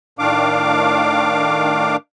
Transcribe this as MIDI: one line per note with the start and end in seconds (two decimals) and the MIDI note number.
0.19 1.96 45
0.19 1.96 51
0.19 1.96 62
0.19 1.96 77
0.19 1.96 86